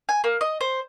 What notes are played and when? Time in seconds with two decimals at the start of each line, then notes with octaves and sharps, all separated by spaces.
0.09 G#5
0.24 A#3
0.41 D#5
0.61 C5